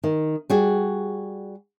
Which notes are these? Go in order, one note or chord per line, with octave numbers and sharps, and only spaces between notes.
D#3
G3 F#4 G#4